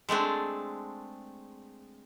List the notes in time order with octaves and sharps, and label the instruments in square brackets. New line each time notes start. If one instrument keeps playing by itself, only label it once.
[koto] G#3 A3 C4 D4